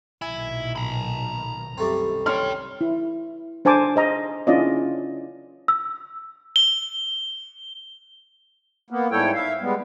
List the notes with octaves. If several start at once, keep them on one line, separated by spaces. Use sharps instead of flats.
B1 A#2 D#3 E4 G#5
A#5 B5
C2 F#2 D#3 G3 A3 C4
C#5 D5 G5 C6 F6
E4
D4 C5 G#5 A5 D6
C5 D#5 A#5
C#4 D4 E4 F4 D5 D#5
E6
G7
A#3 B3
G#2 G3 E4 A4 C#5 G5
E5 F5
G3 G#3 B3